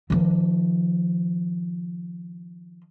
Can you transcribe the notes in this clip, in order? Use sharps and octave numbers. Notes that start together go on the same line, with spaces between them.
D#3 F3